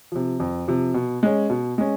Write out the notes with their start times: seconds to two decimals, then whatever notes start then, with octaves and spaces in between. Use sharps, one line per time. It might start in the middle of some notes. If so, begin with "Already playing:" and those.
0.12 C3 F3
0.40 F2
0.68 C3 F3
0.94 B2
1.23 G#3 C#4
1.50 B2
1.78 G#3 C#4